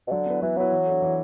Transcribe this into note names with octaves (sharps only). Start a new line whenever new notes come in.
B2
D3 F#3
B3 E4 B4
E3 F#3
F#3 B3 E4 B4
E3
D4 A4
E3